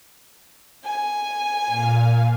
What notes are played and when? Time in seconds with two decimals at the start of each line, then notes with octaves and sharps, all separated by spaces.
0.84 G#5
1.67 A#2 F5